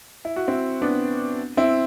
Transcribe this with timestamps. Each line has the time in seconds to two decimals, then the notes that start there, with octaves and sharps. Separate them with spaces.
0.25 E4
0.36 F#4
0.48 C4 E4
0.82 B3 D4
1.57 C4 E4